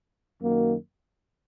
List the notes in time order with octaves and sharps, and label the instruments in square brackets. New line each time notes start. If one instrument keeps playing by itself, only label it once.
[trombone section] F#2 D#3 A#3 F#4